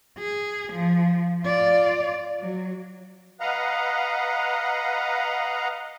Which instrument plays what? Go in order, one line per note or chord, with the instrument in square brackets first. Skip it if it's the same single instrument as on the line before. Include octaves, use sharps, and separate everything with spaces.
[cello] G#4
F3
F4 D5
F#3
[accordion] B4 D#5 F5 F#5 A#5